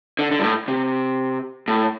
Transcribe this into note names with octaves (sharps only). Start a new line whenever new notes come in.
D3
D3
G2
A2
C3
A2